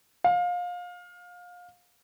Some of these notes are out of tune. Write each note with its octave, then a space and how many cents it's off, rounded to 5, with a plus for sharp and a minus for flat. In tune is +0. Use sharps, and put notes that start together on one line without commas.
F5 +25